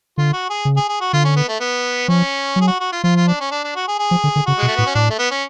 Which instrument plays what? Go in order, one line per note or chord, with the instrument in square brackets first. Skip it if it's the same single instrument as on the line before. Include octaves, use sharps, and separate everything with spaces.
[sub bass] D3 [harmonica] F4
[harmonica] F#4
G#4
[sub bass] C#3
[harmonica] G#4
G#4
F#4
[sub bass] D3 [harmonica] F4
[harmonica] C#4
B3
A3
B3
[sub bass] F3 [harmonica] C#4
[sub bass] F#3
[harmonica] G#4
F#4
F#4
F4
[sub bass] F3 [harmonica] F4
[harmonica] F4
D4
C#4
D4
D4
F#4
G#4
G#4
[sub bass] F3
D3
D3
[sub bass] C#3 [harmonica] F#4
[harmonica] G#3
[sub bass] B2
[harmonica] A3
[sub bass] A2 [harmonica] B3
[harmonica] C#4
[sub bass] A2 [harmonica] D4
[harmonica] A3
B3
C#4